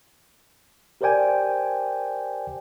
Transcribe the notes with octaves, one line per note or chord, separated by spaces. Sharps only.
G4 A#4 C5 D5 G5 G#5